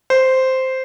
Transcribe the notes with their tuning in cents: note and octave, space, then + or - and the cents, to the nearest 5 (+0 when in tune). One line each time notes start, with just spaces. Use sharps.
C5 -5